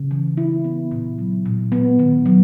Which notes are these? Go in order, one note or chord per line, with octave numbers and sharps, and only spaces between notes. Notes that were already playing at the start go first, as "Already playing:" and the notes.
Already playing: C#3
E3
E4
B3
A#2
F#3
A#2
B3
D#3
F#3